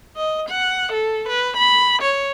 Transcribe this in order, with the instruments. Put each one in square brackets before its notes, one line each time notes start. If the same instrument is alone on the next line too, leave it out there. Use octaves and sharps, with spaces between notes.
[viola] D#5
F#5
A4
B4
B5
C#5